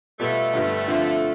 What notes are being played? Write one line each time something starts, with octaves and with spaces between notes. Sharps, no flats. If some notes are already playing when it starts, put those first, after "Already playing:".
B2 G3 A3 B3 F4
G2 D3 G3 B3
D3 F3 C4 F4